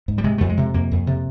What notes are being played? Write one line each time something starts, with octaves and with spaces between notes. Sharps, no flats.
G#2
G3
C3 G#3
F2 A3
G#3
C3
F2 A#3
F2
C3